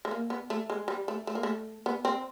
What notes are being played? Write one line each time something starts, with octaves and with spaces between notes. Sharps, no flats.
A3
A#3
B3
A3
G#3
G3
A3
A3
A#3
A3
B3
C4